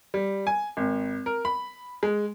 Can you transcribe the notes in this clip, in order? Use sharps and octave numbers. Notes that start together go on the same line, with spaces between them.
G3
G#5
G#1
A#4
B5
G#3